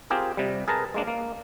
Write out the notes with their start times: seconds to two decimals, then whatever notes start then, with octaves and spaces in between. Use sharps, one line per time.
0.10 C4 F4 G4 G#4 A#4
0.37 C3 G3
0.68 G#4 A#4 B4 A5 A#5
0.94 G#3 A#3 D4
1.07 A#3